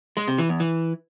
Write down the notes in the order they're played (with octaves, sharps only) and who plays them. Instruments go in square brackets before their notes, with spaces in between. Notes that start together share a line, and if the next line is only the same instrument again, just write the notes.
[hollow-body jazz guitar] G#3
C3
E3
E2
E3